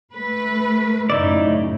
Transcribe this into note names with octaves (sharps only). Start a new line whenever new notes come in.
A3 B4
F#2 A2 C#3 D#4 E4 D5